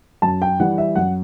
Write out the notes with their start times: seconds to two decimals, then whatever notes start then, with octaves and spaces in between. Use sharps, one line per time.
0.22 F#2 A5
0.42 G5
0.60 E3 G3 F#5
0.78 E5
0.95 F#2 F#5